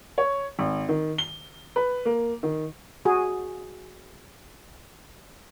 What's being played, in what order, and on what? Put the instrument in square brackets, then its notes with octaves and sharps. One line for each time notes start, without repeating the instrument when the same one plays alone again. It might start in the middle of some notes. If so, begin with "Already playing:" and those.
[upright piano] C#5
G#1
D#3
G7
B4
A#3
D#3
[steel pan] F#4 G#4